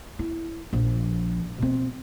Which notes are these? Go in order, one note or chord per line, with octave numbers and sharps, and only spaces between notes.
E4
A#1 F3
B2 C4